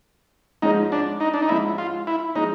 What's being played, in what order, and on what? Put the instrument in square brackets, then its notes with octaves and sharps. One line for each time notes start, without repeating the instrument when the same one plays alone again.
[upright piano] G#2 F3 G#3 C#4 [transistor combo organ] D#4
[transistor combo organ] D4
D#4
D4
D#4
[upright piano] G#2 F3 G#3 C#4 [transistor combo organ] E4
[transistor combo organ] F4
E4
[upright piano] F3 G#3 C#4 [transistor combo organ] D#4